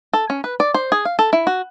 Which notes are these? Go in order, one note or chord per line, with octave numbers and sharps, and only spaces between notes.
A4
C#4
B4
D5
C5
G#4
F5
A4
E4
F#4